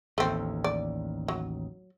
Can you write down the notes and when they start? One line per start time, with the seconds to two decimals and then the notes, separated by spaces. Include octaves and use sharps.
0.18 A1 D#2 A3 C4
0.64 D5
1.28 F#3